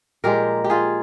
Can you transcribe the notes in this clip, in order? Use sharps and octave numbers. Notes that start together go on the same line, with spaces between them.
A#2 F3 G#3 G4 A#4
G4
F4 G#4